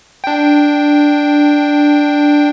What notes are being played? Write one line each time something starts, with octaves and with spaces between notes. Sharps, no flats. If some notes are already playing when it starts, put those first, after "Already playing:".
D4 G5